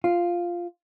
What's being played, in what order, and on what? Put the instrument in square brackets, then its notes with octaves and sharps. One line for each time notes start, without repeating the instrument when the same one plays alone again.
[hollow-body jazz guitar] F4